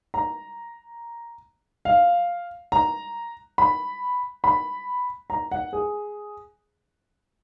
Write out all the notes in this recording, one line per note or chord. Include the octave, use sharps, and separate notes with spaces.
A#5
F5
A#5
B5
B5
A#5
F#5
G#4